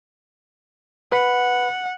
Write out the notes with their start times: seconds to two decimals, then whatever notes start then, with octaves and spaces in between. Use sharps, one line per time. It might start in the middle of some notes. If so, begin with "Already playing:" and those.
1.12 B4 F#5 B5